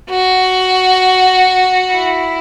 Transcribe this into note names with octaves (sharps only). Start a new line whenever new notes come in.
F#4
E4